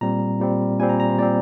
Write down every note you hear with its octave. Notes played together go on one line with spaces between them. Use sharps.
A#2 G3 C4 A#5
A#2 G3 C4
A#2 G3 C4 G#5
A#5
A#5
C5
A#2 G3 C4 D5